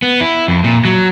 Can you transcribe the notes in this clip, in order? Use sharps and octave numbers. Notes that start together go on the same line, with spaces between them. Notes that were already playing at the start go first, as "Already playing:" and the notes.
B3
E4
F2
A#2
F#3